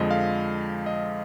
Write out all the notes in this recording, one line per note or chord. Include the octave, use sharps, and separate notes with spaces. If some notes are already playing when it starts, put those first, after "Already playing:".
Already playing: F2 D3 F3 G#3 D#5
F5
D#5